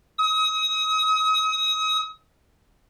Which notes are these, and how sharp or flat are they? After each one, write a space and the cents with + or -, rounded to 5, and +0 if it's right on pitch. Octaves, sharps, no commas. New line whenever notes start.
D#6 +35